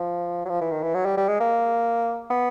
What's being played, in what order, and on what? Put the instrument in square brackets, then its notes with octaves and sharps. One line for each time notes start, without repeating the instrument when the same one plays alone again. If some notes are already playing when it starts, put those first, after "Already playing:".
Already playing: [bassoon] F3
F#3
F3
E3
D#3
E3
F#3
G3
G3
G#3
A#3
B3